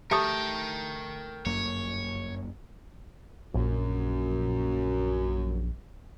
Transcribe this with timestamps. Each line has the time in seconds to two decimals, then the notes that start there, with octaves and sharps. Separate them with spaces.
0.11 A3 G4 A#4 G5 A5 D#6
1.46 G1 F#2 A#3 C#5
3.54 A#1 F#2